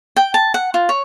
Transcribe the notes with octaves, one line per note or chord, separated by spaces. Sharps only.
G5
A5
F#5
F4
C#5